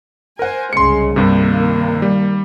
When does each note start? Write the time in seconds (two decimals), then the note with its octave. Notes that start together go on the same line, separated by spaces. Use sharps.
0.39 A#4 C5 F#5 G#5
0.73 C2 C#3 G#3 C6 C#7
1.16 G2 C3 D#3 A#3
2.02 G3